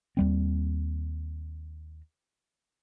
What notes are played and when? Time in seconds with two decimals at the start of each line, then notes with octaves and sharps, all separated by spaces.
0.17 D#2 G3 C4